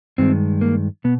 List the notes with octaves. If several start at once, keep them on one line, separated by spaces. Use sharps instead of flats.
G2 D#3 G#3 C4
A#3
B2 B3